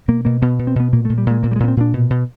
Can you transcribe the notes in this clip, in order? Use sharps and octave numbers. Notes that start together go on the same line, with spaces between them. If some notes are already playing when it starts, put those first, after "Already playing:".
B2 A#3
B2 A#3
B2 B3
B2
C4
B2 B3
A#2 A#3
A#2 A3
G3
A#2 G#3
A#2 A#3
G3
G#3
A#2 B3
C4
A#2 D4
B2
B2